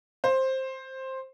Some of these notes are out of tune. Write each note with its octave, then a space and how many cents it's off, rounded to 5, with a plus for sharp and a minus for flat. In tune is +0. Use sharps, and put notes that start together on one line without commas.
C5 +10